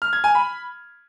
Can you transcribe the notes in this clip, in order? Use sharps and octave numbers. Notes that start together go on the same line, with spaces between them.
F6
G#6
G#5
B5